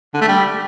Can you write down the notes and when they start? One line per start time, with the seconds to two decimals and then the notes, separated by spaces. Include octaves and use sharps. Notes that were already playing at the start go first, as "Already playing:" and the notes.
0.14 D3
0.21 A3
0.28 G3